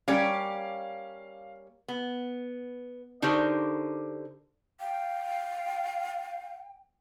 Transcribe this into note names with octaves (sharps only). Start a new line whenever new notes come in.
G3 A#3 C#4 G4 C#5 D5 F5
B3
D3 D#4 F#4 G4 A#4 C5
F5 G5